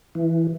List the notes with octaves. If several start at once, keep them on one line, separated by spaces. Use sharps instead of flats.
E3